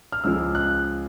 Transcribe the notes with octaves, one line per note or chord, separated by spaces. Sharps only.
F6
C#2 C#3 F3 G#3 E6
F#6